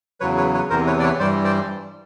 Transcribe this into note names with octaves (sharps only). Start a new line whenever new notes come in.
E2 C#3 F#3 B4 C#5
B4 C#5
B4 C#5
E2 C3 E3 A#4 C5
B4 C#5
D5
B4 C#5
G2 E3 G3 C5 D5
C5 D5